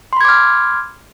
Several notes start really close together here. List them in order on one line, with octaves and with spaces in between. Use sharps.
C6 B5 G#6 D6 F6